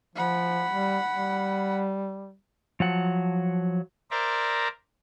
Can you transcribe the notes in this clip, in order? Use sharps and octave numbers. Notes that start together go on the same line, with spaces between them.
F3 F#5 B5
G3
G3
F3 F#3 F#5
A#4 C5 D5 E5 A#5